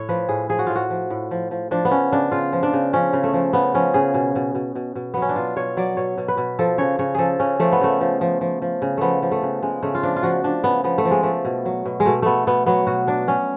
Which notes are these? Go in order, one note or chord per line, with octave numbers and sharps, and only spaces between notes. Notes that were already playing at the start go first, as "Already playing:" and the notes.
Already playing: A2 C#5
F3 B4
A2 G#4
F3 G#4
F#4
A2 F4
F#4
F3
A2
F3
F3
F3 D4
B3
C#3 C#4
C#3 D4
C#3 F4
F3
D4
C#3
F3 C#4
C#3
A3
F3
C#3 B3
F3 C#4
C#3 G#4
B2
B2
B2
B2
B2
F#3 B3
C#4
D4
B2 F4
B2 C#5
F#3 D5
B2 C#5
B2
B4
B2
F3 A4
C#3 C#5
C#3 C#5
F3 G#4 A4
C#3 C#4
F3 A3
B3
C#3 A3
F3
F3
F3
F3
C#3
F3 A3 B3
F3
A3
C#3
C#3 G#3
C#3 A3
F4
F3 D4
F4
F3 F#4
F3 D4
C#3 B3
F3 B3
A3
F3
G#3
F3 A3
B2
F#3
B2
G#3
B2 A3
B2 A3 B3
B2 B3
F#3 B3
B2 F#4
F#3 D4
F#3 C#4